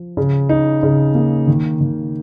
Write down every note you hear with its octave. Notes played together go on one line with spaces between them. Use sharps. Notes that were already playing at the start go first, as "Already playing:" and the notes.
Already playing: F3
C#3
D#4
C#3
A#3
D#3
D#3